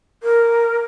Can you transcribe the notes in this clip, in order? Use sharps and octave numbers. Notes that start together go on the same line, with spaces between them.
A#4